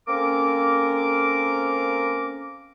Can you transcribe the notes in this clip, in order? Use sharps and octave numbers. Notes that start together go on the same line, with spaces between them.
A#3 C4 C#4 A4 A#4 D6